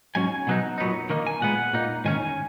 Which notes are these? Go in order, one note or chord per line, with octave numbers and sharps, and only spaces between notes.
G#2 F#3 C#4 G#5
B2 F#3 B3 D#4
A#2 F#3 B3 D#4
D#3 A#3 D#4
G#5
A#2 G#3 B3 F#5
A#2 A#3 D#4
G#2 D#3 C#4 G#5